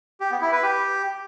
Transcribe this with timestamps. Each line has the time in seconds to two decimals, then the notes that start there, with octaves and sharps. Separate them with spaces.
0.20 G4
0.31 B3
0.42 E4
0.52 B4
0.63 G4